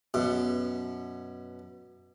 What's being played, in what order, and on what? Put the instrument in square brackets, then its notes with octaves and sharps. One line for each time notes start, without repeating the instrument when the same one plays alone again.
[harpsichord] F#2 B2